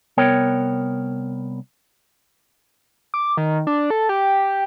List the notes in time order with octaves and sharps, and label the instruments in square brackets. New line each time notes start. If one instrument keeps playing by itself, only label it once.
[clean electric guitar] C2 B3 A#4 C#5 G5
[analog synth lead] D6
D#3
D4
A4
G4